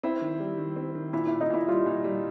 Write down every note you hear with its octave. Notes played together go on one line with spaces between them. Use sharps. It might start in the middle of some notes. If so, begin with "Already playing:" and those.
C4 E4
D#3
G3
D#3
C4
D#3
A#2 E4
A#2 E4
D#4
A#2 E4
G3 F4
A#2
G3